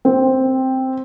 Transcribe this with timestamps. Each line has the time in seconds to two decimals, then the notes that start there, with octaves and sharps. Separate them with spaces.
0.05 C4